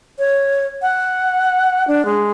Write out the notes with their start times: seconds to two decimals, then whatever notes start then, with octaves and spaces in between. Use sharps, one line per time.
0.19 C#5
0.82 F#5
1.88 D4
2.05 G#3